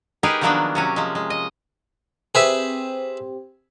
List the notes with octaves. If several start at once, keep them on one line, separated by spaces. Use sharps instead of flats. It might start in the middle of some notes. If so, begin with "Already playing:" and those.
D#4 G4 G#4 A#4 B4
D#3 F3 F#3 A#3 B3 D4
C3 F#3 C#4
F3 G#3
G#3
D#5
C4 G4 G#4 B4 C5 E5